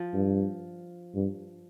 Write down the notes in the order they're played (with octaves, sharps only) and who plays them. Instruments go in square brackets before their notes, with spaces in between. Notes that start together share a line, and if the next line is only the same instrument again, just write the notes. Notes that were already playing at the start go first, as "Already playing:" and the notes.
Already playing: [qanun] F3
[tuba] G2
G2